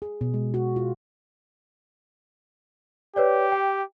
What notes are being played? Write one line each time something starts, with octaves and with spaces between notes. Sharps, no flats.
G#4
B2
G#3
F#4
F4
G4 B4 C#5 D5
G5